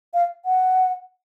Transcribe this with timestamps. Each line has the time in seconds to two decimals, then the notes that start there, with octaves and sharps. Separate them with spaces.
0.14 F5
0.45 F#5